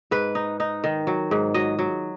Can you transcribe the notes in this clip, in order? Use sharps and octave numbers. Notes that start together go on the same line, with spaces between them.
G#2 B4
D#4
D#4
D#3
F#3
G#2
F#3 D#5
F#3